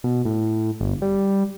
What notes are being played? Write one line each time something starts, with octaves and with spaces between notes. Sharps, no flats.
B2
A2
G1
G3